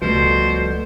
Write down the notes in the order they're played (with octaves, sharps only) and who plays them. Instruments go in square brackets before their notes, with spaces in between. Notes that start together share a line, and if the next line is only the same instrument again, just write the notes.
[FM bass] C#2 [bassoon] B2 [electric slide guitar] F3 G3 A3 [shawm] C5